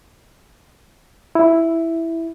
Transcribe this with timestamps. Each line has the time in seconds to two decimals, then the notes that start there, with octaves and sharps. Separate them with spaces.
1.35 E4